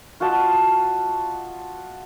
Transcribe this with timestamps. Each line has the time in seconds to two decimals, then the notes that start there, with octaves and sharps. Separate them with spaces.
0.20 F4 F#4 D#5 A5